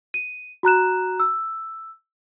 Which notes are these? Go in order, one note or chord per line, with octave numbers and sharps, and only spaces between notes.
D#7
F#4 A#5 F#6 E7
E6